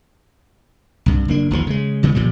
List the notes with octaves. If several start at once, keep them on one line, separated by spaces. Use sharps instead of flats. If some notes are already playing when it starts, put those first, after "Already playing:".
C2 G2
F#1 A#3 D4
G1 D#2 A#2 F3
C#3 G#3
C#2 C#3 G3 B3
F#1 A#2 F3 G3